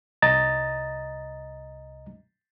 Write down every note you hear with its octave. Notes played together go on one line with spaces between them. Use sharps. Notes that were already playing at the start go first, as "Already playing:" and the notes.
C2 D#5 A#5 A6